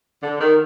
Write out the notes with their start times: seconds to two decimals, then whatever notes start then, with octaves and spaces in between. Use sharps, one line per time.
0.22 D3
0.41 D#3